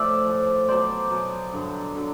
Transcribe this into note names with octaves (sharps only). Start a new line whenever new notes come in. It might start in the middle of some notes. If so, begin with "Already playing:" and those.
Already playing: A2 F3 D5 E5
A2 F3
B2 F#3 C5 D5
B2 F#3
G2 D3 F#3
D3 F#3